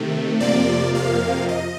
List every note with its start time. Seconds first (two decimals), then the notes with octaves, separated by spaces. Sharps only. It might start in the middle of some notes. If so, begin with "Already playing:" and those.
Already playing: C3 D#3 A3
0.40 F2 C3 F3 A#3 D5
0.95 F5
1.49 D#5